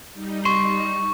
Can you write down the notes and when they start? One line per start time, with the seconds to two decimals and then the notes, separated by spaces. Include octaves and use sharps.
0.14 G3 D#4
0.45 C6 C#6